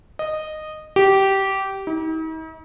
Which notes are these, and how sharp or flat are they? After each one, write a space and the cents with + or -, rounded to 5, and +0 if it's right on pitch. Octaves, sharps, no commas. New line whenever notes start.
D#5 -10
G4 -15
D#4 +45